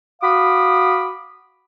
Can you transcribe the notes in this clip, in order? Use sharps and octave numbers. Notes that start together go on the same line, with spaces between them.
F#4 F5 B5 D6 D#6